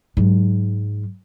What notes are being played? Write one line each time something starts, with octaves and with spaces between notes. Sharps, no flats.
G#2 F#3